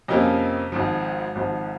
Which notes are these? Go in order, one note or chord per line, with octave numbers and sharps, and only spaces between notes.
F2 C3 F3 A#3 C#4 D#5
G#1 G#2 F3
G#1 G#2 F3